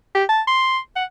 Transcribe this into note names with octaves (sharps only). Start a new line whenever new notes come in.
G4
A5
C6
F#5